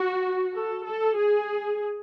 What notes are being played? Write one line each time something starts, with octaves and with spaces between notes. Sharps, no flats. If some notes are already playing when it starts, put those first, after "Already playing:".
Already playing: F#4
A4
A4
G#4